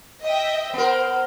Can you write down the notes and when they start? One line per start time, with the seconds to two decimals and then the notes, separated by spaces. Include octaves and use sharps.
0.22 D#5 E5 G5
0.73 B3 A#4 C5